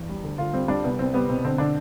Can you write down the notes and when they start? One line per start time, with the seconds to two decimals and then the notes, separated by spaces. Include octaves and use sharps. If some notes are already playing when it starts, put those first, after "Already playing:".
Already playing: E2 G2
0.09 G3
0.24 D2
0.38 D2 F4
0.53 G3 C4
0.68 G3 D4
0.84 C2 B3
0.99 C2 C4
1.14 G3 B3
1.29 B2 C4
1.44 D3 C4
1.58 D3 D4